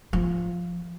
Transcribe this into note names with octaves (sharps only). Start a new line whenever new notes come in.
F3